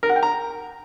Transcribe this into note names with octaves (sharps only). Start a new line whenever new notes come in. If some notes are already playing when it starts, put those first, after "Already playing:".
A#4
F#5
G5
A#5